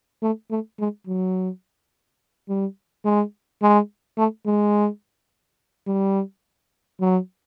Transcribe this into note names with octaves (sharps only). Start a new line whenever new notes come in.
A3
A3
G#3
F#3
G3
G#3
G#3
A3
G#3
G3
F#3